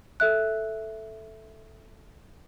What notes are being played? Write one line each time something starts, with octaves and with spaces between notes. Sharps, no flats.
A4 E5 F#6